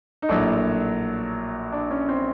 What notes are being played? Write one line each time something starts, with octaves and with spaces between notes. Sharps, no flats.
D#4
A#1 A2 F#3 A#3 D4
D4
C#4
C4